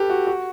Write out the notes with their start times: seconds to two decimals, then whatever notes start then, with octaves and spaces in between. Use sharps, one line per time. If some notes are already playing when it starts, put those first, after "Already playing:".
Already playing: G4 A4 B4
0.09 F#4
0.27 F#4